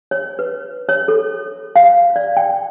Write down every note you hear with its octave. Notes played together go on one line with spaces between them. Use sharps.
C#5
B4
C#5
A4
F5
D5
G5